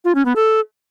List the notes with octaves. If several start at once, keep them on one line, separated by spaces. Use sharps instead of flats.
F4
C#4
B3
A4